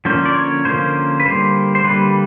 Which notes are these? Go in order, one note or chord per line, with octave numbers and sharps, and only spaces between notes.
D3 F3 A#3 C#4 C5
D5
C#5
D3 F3 A#3 C#4 C5
B4
D3 G3 A#3 C5
C5
D3 G3 A#3 B4